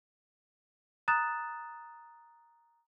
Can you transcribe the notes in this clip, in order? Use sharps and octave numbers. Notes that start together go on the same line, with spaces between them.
A#5 D#6 F#6 A6 E7